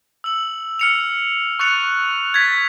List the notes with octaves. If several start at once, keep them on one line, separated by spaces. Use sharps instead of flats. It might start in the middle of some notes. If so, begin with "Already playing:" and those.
E6 F#7
F6 C#7 F7
C#6 F#6 A6 C#7 F7
G#6 A6 B6